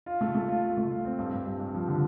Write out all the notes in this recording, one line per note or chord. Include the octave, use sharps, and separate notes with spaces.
F4
A3
A3
F4
F4
A3
F4
C4
G2
G2
G2
G2
F3
D3